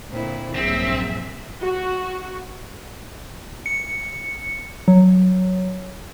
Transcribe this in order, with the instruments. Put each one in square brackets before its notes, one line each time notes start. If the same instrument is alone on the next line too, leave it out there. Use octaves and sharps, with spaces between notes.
[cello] A#2 [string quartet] D3 C4 E4
[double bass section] A#1 G2 F#3 [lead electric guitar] C4 [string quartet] G#4 [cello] E5
[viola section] F#4
[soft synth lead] C#7
F#3